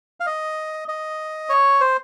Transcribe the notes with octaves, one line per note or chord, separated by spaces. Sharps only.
F5
D#5
D#5
C#5
C5